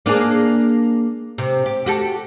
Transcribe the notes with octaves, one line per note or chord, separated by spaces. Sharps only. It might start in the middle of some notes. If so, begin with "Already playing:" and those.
A#3 D4 G#4
C3
G4
F#4 G4 A4